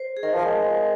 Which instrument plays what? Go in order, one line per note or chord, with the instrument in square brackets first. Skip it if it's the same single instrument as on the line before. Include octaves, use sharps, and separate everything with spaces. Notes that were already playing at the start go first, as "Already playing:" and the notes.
Already playing: [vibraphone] C5
G#4
[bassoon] D#3 [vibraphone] A#4
[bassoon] F3
G#3